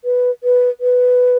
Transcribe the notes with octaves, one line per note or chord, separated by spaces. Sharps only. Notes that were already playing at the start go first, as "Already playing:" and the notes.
B4
B4
B4